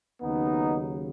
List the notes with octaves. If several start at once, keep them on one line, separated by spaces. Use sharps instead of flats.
D#2 C#3 F#3 B3 D#4